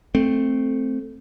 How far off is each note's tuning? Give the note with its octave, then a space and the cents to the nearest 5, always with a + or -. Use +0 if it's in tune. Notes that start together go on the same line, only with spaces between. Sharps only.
A3 +0 C4 +0